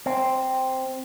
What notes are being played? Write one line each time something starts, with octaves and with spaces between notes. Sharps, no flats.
C4